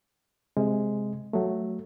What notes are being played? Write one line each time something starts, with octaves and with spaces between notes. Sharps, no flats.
C3 G#3
F#3 A3